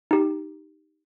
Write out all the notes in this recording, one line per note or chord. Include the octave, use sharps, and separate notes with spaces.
D#4 G4